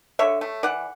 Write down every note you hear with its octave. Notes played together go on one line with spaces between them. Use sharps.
D3 C#5 E5
A3
E3 D5 F#5